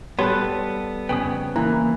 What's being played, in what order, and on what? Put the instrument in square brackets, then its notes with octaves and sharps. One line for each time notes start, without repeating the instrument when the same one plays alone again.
[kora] G3 B4 [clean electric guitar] B3 A4 [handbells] C#5 B5 C6
[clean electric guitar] F2 C#3 B3 [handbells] G5 G#5 D#6
[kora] E3 [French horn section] A#3 [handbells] A#5